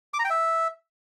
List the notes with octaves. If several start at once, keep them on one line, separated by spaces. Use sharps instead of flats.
D6
A#5
G5
E5